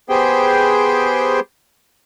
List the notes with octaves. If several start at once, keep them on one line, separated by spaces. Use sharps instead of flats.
B3 G4 G#4 C5 G5